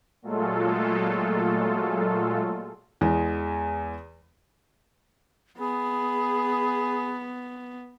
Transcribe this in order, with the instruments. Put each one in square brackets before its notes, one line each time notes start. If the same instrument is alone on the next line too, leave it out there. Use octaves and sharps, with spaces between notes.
[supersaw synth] A#2 F#3 G#3 A3 F4 A4
[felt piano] E2 G#3
[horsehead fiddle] B3 [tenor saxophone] G#4 [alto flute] B5